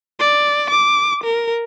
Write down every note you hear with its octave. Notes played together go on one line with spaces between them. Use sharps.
D5
D6
A#4